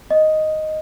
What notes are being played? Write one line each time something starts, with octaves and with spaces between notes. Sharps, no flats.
D#5